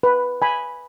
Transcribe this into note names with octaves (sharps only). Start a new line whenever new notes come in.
B4
G#5 B5